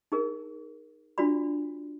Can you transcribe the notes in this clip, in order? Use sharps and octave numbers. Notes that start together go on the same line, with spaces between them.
D#4 G#4 A#4
D4 F4 F#4 D5 B5